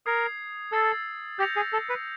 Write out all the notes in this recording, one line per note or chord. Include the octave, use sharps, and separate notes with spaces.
A#4 D#6 G#6 C7
A4 E6 A6 C7
G4 G6 A#6 C#7 F7
G#4
A4
B4